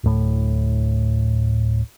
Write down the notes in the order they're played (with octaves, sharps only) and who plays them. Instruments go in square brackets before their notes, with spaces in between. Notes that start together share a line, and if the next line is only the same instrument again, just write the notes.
[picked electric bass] D1 A2